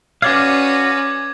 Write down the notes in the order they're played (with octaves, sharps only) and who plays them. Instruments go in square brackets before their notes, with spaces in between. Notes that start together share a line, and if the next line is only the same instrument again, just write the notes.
[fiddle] C#4 B4 [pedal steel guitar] F#4 D5 F5 [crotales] D6 G#6